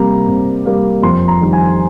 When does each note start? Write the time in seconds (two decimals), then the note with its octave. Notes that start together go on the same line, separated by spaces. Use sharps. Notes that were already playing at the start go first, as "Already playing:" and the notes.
Already playing: C3 G3 A#3 A#5
0.28 C3
0.66 G3 A#3
1.03 F2 C6
1.28 A#5
1.41 D#3 G3
1.53 G#5